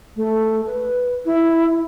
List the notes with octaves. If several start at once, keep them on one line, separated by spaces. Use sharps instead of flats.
A3
B4
E4